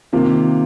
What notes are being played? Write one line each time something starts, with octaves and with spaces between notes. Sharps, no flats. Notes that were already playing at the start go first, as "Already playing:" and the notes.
C3 D#3 A#3 F4